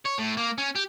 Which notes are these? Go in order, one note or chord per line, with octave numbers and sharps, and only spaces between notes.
C#5
A2
A#3
C#4
G4